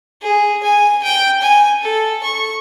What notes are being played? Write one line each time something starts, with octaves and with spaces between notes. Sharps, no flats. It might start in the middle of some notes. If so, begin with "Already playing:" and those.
G#4
G#5
G5
G#5
A4
C#6